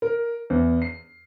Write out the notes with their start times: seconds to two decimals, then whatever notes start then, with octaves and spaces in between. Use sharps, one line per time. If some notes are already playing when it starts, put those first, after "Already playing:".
0.02 A#4
0.50 E2
0.82 C7